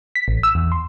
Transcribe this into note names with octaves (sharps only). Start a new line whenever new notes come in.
B6
A1
E6
E2
C6